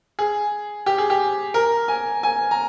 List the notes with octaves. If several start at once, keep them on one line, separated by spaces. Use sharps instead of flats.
G#4
G4
G#4
G4
A#4
G#5
G#5
A#5